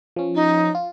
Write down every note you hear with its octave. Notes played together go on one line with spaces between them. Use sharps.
F3 C#4
D#4
F4